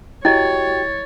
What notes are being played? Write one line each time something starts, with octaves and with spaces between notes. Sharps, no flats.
E4 F#4 G4 C#5 D#5 G5 A6